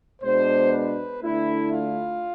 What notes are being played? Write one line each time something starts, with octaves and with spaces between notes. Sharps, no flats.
B2 G#3 B3 D4 C5
B4
D3 A3 D4 E4
F4